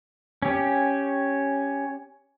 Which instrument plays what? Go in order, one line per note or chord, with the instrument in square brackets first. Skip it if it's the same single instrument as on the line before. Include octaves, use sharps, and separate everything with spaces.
[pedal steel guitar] C#4 G4